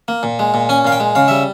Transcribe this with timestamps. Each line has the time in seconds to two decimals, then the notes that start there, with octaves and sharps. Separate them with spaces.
0.08 A#3
0.23 A#2
0.39 G#3
0.54 A#2
0.69 C#4 G#5
0.85 A#2 F5
0.92 G5
1.00 G#3
1.15 C#3 F5
1.28 G3 E5